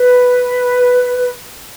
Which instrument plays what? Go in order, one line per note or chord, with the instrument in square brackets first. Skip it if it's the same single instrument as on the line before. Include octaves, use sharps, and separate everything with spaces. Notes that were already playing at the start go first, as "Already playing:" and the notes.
Already playing: [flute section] B4